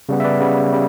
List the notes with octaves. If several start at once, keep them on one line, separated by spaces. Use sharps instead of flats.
C#3 G3 B3
E5
B4 D5
C#3 G3 B3
C#3 G3